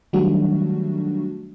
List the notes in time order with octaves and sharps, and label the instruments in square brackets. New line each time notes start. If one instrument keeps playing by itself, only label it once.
[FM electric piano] D#3 F#3 G3 A3 D4 F#4